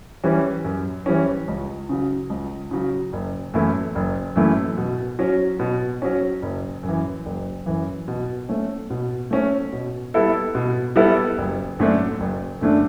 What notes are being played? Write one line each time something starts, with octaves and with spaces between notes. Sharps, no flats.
E3 G3 C#4
F#2
E3 G3 C#4
C#2
C#3 F#3
C#2
C#3 F#3
F#1
F#2 E3 A3 E4
F#1
F#2 E3 A3 E4
B2
F#3 C#4
B2
F#3 C#4
F#1
F#2
E3
F#1
F#2 E3
B2
A3 C#4
B2
A3 C#4
B2
G3 B3 E4 A4
B2
G3 B3 E4 A4
F#1
F#2 D3 A3 D4
F#1
F#2 D3 A3 D4